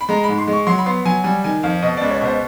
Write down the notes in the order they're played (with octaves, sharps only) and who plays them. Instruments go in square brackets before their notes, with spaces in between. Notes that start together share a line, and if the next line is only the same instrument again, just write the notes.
[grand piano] B5
G#3 A#5
G#2 B5
C6
G#3
C#6
F#3 C6
B5
B3 C6
F#3 G#5
G3 G#5
D#3 G#5
F2 F5
B2 D#5
C#2 D5
C#5
B2 C5